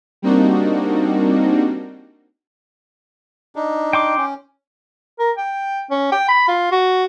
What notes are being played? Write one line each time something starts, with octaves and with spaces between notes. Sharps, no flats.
G3 A#3 C4 D4 D#4 F#4
D4 D#4
G5 C6 D6
C#4
A#4
G5
C#4
G5
B5
F4
F#4